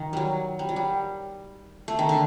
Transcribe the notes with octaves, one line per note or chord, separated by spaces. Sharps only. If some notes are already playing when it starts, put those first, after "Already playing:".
Already playing: D#3
F#3 G3
G3
F#3
G3
A3
D#3
D3